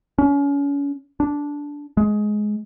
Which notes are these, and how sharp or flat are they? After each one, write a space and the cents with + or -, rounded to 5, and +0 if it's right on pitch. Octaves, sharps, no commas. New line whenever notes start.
C#4 +35
D4 -10
G#3 +15